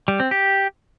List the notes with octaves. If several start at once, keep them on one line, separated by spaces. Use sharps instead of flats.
G3
C4
G4